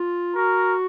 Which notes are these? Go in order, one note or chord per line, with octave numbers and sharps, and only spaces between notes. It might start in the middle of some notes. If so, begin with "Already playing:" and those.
Already playing: F4
F#4 A#4